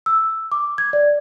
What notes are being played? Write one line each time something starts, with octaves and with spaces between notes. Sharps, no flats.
E6
D6
G#6
D5